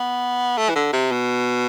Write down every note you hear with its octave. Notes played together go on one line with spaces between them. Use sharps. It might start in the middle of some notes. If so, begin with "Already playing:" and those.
Already playing: B3
A3
E3
D3
C3
B2